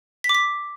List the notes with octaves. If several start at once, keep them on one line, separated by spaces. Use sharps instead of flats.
B6
D6
B6